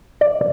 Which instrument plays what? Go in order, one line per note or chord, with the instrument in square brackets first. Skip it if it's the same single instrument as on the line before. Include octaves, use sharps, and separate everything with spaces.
[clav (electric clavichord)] D5